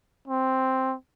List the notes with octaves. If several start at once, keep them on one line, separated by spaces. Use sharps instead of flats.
C4